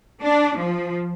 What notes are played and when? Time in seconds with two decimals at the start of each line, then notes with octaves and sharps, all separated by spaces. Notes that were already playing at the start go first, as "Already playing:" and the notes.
0.22 D4
0.57 F3